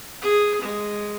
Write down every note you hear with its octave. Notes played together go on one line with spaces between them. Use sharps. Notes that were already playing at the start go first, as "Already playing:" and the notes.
G#4
G#3